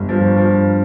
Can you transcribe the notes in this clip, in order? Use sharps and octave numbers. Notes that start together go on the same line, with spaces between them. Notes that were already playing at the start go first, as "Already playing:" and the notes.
Already playing: G1 G2
F3
F3